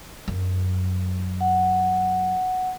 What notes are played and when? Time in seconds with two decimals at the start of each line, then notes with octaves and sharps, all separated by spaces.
0.28 F#2
1.41 F#5